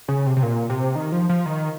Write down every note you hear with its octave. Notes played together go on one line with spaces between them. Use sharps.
C#3
C3
C3
A#2
C3
D#3
F3
F3
D#3